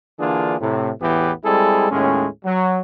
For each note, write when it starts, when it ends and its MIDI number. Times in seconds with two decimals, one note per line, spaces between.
0.19 0.56 50
0.19 0.56 52
0.19 0.56 58
0.19 0.56 62
0.19 0.56 65
0.19 0.56 68
0.60 0.91 45
0.60 0.91 48
1.01 1.32 33
1.01 1.32 40
1.01 1.32 45
1.01 1.32 52
1.01 1.32 59
1.01 1.32 67
1.44 1.87 55
1.44 1.87 56
1.44 1.87 60
1.44 1.87 64
1.44 1.87 68
1.44 1.87 69
1.91 2.26 39
1.91 2.26 45
1.91 2.26 56
1.91 2.26 61
2.45 2.81 54